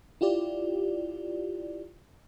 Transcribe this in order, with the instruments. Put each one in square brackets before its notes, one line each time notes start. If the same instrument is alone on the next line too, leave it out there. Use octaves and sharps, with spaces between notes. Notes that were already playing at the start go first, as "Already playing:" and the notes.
[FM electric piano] E4 F4 G4 D5